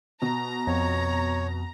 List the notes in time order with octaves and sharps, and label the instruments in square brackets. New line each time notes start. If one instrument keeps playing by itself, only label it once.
[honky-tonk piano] B2 [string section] A#5
[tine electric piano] F2 [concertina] C#5